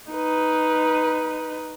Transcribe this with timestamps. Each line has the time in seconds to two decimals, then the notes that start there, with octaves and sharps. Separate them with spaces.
0.11 D#4 B4